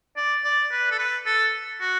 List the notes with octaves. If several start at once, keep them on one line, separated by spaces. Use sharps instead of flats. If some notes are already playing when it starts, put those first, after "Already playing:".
D5
D5
B4
A4
B4
A4
F#4